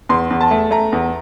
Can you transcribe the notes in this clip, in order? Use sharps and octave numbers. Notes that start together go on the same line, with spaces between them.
E2 C6
E2
A5
A3
A3 A#5
E2